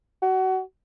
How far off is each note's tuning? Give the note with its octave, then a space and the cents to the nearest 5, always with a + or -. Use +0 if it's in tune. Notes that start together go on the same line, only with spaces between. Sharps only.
F#4 +25